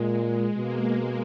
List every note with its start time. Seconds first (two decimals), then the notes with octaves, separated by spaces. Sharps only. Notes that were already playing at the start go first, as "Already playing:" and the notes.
Already playing: A#2 G#3
0.56 B2 A#3